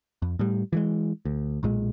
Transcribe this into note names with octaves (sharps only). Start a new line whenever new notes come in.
F2
A2 G3
E3 F3 G#3
D2
B1 A#2 G#3